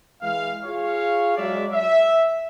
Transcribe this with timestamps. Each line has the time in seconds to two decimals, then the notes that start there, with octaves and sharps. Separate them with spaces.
0.22 E3 G#3 F5
0.65 F4 G#4 C#5 F5
1.37 F#3 G#3 D4 D5 E5
1.72 E5